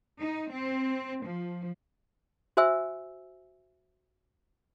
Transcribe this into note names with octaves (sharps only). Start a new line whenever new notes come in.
D#4
C4
F3
F#4 C5 E5 G#5 E6